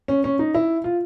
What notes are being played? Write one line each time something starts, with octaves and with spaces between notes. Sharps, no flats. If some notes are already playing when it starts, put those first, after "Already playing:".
C#4
C#4
D#4
E4
F4